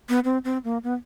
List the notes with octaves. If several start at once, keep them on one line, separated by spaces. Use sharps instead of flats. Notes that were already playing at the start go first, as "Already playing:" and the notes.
B3
C4
C4
A#3
B3